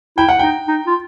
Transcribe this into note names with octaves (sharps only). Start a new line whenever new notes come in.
E4 G5
F#5
D#4 G5
D#4
F4